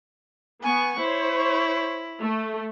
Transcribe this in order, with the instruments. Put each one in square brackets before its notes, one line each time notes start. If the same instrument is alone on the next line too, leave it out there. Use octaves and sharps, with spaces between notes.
[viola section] B3 [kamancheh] G#5 C#6
[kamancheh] E4 [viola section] C5 C#5
[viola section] A3